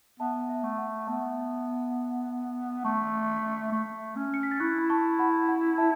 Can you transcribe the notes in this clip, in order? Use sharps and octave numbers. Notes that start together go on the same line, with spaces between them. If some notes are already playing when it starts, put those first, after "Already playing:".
B3 E5 A5
E5
A3
F#5
B3 E5 A5
A3 A5 C#6
A3
C#4
C#7
B6
A6
E4 C#6 F#6
B5
A5 C#6
F#5 B5
F#5
E5 A5